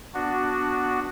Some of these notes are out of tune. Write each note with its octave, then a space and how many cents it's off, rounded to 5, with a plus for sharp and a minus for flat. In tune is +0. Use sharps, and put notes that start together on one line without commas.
B3 +0 D4 +0 F#4 +0